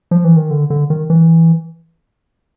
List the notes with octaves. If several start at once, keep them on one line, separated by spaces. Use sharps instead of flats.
F3
E3
D#3
D3
D3
D#3
E3